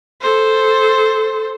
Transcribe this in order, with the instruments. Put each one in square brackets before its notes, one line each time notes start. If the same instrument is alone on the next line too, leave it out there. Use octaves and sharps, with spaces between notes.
[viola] A4 C5